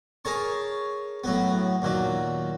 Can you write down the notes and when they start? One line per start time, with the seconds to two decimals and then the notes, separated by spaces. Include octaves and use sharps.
0.25 G#4 A#4 C#5 A5 C#6
1.24 A2 F#3 B3
1.82 D#2 A#2 F#3